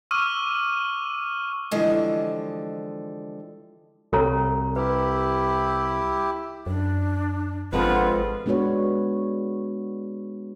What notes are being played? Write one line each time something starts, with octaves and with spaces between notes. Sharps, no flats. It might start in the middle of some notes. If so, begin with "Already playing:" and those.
C#6 D6 E6 F6 D#7
D3 E3 F3 G3 G#3 D#5
C2 A4 C#5 A#5
E4 G4 B4
F#2 D4
G#1 D3 F3 G#3 B3 C4 F4 B4
G#3 B3 D4 F#4 B4 C#5